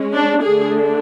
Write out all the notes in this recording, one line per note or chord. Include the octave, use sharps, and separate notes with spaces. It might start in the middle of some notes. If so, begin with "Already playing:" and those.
Already playing: G#3 C#4
D4
D3 A3 D4 G#4